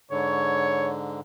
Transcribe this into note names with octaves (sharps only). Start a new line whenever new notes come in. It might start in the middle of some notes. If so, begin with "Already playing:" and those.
G#2 D3 C#5